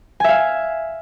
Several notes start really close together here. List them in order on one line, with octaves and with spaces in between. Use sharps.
G#5 E5 F5